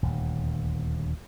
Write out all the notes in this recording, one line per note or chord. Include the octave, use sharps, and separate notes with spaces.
D#1 D2